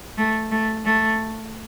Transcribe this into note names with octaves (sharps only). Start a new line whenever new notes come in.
A3
A3
A3